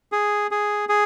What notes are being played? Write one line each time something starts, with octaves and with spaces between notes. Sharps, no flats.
G#4
G#4
G#4